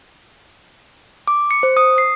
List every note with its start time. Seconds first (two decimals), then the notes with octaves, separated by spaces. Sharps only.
1.28 D6
1.51 C#7
1.63 C5
1.77 D#6
1.98 C7